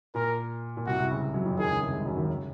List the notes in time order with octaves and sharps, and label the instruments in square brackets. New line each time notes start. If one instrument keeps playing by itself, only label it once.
[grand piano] A#2 [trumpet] A#4
[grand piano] A#2
[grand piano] C2 C3 [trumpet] F#4
[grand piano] C2 C3
C#2 C#3
F#2 F#3
F2 F3
[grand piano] D#2 D#3 [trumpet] G#4
[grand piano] C#2 C#3
C2 C3
G#2 G#3
F#2 F#3
D#2 D#3
C#3